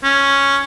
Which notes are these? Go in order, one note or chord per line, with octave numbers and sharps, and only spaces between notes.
C#4